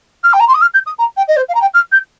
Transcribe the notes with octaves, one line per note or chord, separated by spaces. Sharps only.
F6
G5
A#5
C6
D#6
F6
G6
D#6
A#5
G5
D#5
C5
F5
A#5
G5
F6
G6